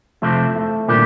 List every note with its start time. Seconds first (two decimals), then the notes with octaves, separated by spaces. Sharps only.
0.22 F2 C3 F3 A3 C4
0.56 A3
0.88 A#2 D#3 G3 D4 G4